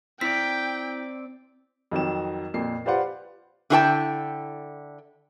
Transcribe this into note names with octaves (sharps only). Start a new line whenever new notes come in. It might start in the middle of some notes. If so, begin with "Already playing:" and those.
C4 E4 D5 G5 B6
F2 D#3 F#3 E7
F2 A#2 C7
F4 G4 B4 C5 D5 F#5
D3 E4 G#4 C#5 G5 A5